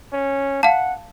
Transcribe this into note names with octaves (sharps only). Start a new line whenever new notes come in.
C#4
F5 F#5 A5